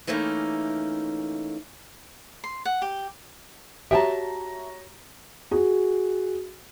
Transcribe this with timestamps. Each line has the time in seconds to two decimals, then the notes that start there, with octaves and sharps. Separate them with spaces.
0.07 E3 A3 A#3 C#4 D#4
2.44 C6
2.65 F#5
2.82 G4
3.91 F#4 G4 C#5 E5 G5 A5 A#5
5.51 F#4 G#4